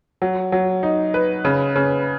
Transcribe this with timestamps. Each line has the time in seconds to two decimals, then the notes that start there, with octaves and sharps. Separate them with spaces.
0.22 F#3
0.52 F#3
0.83 D#4
1.14 B4
1.45 C#3
1.76 C#3